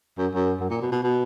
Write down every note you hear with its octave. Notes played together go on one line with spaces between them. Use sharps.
F#2
F#2
F#2
A#2
B2
B2
B2